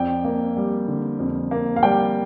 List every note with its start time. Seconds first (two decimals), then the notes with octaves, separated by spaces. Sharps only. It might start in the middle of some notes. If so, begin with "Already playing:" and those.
Already playing: F2 D5 G5
0.24 A#3
0.57 G3
0.88 D3
1.20 F2
1.51 A#3
1.76 F5
1.83 G3 D5 G5